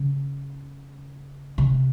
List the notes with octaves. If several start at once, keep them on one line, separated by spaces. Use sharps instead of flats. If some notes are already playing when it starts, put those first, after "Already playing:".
Already playing: C#3
C3